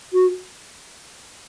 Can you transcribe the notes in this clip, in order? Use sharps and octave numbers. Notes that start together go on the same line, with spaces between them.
F#4